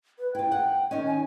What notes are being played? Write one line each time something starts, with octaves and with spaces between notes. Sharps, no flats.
B4
E4 F4 G5
F#5
D#3 C#4 D#5
G#5